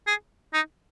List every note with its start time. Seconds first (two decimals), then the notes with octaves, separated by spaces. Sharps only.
0.07 G#4
0.54 D#4